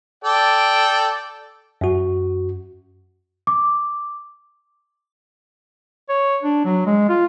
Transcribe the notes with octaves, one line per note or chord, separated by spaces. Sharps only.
A4 D5 G5
F#2 F#4
D6
C#5
D4
F#3
G#3
F4